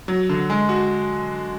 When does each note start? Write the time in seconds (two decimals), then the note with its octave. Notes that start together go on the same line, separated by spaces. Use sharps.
0.08 F#3
0.29 D3
0.50 G#3
0.69 F#4